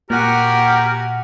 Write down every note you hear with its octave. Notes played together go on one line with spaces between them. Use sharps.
A#2 F#4 G4 A#4 F#5 G#5